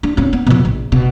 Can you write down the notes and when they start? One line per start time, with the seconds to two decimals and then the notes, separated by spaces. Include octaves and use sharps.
0.03 D4
0.17 C4 C#4
0.33 B3
0.46 F2 B2
0.65 A#1
0.92 B2